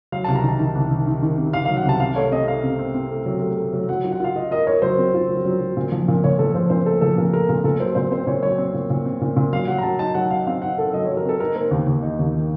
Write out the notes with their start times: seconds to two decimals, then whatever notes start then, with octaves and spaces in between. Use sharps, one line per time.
0.12 F#3 F5
0.24 A5
0.28 C2
0.35 A#5
0.44 D#3 A5
0.59 D#3
0.75 C2
0.91 D#3
1.07 D#3
1.22 D#3
1.38 C3
1.53 D#3 F5
1.65 F5
1.69 F#3
1.77 F#5
1.85 C2 A5
2.00 C3 F5
2.16 A3 C#5
2.32 C4 D#5
2.48 A3 F5
2.63 C3
2.79 C4
2.94 C4
3.11 A3
3.26 F#3
3.42 A3
3.57 A3
3.73 F#3
3.89 F#3 F#5
4.04 F4
4.12 F#5
4.20 F4 F5
4.36 F4 D#5
4.51 A#4 D#5
4.67 A#4 C#5
4.82 F#3 C5
4.98 C4
5.14 F4
5.29 F#3
5.45 F#3
5.61 F#3
5.77 A#2
5.92 F3
6.08 A#2
6.24 A#2 C#5
6.39 F3 A4
6.54 F3 C5
6.70 A#2 C5
6.86 A3 A4
7.01 F3 A4
7.18 A#2 A#4
7.33 A3 A#4
7.49 A#2 A#4
7.64 A#2 A4
7.80 F#3 C5
7.95 A#2 C5
8.11 C4 C5
8.27 A#2 C#5
8.43 F#3 C#5
8.58 C4
8.74 A#2
8.90 A#2
9.05 C4
9.21 A#2
9.37 A#2
9.53 F#3 F5
9.67 F#3 F#5
9.78 A#5
9.83 F#3 A5
9.99 D#4 A5
10.14 F#3 F#5
10.30 D#4 F5
10.47 C4 F5
10.62 D#4 F#5
10.78 A4
10.93 F#3 D#5
11.06 F#3 C#5
11.17 A#4
11.25 C4 A4
11.40 D#4 A#4
11.56 A#3 C5
11.71 D#2
11.87 D#2
12.02 D#4
12.19 D#2
12.35 D#3